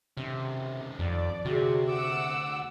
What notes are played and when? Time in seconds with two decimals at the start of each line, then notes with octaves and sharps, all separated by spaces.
0.17 C3 D#3 C#4
0.99 F2 D5
1.45 D2 C3 F#4 G#4
1.89 F#5 D6 E6